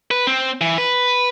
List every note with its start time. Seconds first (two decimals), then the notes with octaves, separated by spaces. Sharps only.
0.11 B4
0.27 C4
0.61 E3
0.78 B4